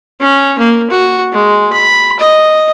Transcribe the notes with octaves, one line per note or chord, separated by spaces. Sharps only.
C#4
A#3
F#4
G#3
B5
D#5